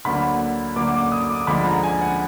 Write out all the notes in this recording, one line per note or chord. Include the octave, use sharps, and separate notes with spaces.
D2 D3 F#3 A#3 B5
D2 D3 F#3 A#3 D6
D6
D#6
D6
D2 D3 F3 G#3 D4 B5
A#5
G#5
F#5